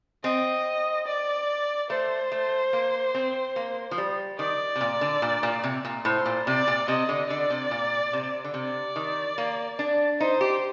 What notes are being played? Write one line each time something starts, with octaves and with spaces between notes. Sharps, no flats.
C4 D#5
D5
A3 C5
A3
A#3
C4
A#3
F3
G3
D#3 D5
C3
A#2
D3
A#2
A#2
C3
A#2
A2 C5
A#2
C3 D5
A#2
C3 D#5
D3
D3 D5
C3
A#2
C3
D3
C3 D5
D#3
A#3
D4
D#4 C5
G4